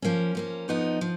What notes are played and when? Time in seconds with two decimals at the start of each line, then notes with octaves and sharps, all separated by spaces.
0.02 F3 A#3 C#4
0.35 F3 A#3 C#4
0.68 F2 F3 B3 D#4
1.01 F3